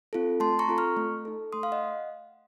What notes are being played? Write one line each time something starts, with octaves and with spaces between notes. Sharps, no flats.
C4 F4 A4
A3 A5 C6
A#5 C#6
C4 F4 A4
C#6 F6
A3
D#4 A4
A3 C6 D#6
F5
D#5 F#5